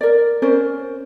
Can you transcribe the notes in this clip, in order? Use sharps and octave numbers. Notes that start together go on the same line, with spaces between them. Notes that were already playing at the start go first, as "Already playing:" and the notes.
A#4 D5
C#4 A#4 C5 D5